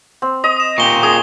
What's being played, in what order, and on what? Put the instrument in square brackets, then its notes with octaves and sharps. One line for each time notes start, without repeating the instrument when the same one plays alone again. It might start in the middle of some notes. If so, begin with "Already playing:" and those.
[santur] C4
[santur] D#5 [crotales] D#6
[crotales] D#6 E7
[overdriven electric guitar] A#2 G4 [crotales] C#6 G7
[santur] G#4 [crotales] D#6